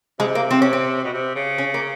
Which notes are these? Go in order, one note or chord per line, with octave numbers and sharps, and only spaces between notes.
C3 G#3
A#3
C4
C#4
C4
B2
C3
C#3
C#4
A#3